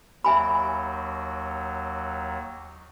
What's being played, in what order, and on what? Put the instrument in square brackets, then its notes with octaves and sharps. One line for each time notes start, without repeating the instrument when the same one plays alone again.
[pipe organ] D#2 F#3 [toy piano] E5 G#5 B5